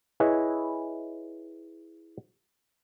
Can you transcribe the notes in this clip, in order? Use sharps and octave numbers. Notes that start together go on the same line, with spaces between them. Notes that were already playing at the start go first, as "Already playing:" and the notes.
E4 G#4 B4 C#5 D#5